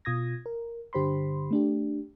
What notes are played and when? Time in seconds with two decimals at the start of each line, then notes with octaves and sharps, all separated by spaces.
0.05 B2 F4 D#6 G#6 A#6
0.46 A#4
0.93 G2 D3 G4 C5 B5 C6
1.51 A3 D4 G4